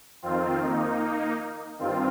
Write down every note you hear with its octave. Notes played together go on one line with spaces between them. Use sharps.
F2 D#3 C4 F4
A#3 D#4
G2 D#3 C4 F4